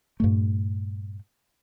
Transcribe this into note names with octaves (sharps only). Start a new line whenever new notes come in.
G2 A#2 A3